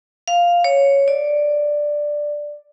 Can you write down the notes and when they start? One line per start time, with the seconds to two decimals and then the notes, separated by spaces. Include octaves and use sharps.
0.28 F5
0.64 C#5
1.08 D5